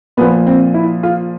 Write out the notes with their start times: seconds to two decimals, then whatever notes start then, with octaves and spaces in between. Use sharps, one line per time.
0.17 A#2 F3 B3
0.46 C4
0.74 E4
1.03 F4